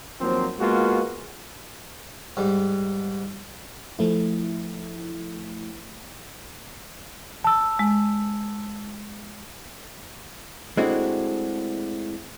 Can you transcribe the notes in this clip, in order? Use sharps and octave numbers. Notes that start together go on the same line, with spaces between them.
D#2 F3 F#3 A#3 C4
G#3 A#3 B3 F4 F#4
G#2 G3
F3 A3 E4
A5 E6
G#3
G#3 A3 C4 D4 E4 F#4